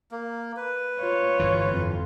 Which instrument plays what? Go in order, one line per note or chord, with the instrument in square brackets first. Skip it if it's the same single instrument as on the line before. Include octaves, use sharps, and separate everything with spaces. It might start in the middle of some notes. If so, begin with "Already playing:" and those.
[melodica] A#3
B4
[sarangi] F4 [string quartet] C#5
[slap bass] G1 G2 E3
[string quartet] F2